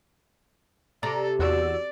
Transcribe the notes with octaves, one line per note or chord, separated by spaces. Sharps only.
C3 A4 D5 A#5
E2 F#4 D5 E6